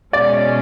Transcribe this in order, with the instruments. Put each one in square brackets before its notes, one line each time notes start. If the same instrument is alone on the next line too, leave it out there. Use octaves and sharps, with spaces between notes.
[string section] B2 G#3 C#4 [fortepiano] D5